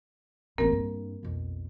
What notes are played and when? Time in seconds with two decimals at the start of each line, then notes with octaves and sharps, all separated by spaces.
0.58 A1 A#3 C4 C#4 A#4
0.72 G2
1.23 B1 F2